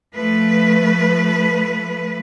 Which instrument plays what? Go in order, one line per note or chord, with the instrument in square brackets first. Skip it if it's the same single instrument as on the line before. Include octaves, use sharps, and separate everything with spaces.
[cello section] F3 A3 B4